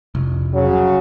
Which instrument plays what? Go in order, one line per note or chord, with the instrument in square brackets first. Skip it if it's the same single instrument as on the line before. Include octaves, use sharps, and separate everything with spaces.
[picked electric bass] F1 C2
[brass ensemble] C#3 F#3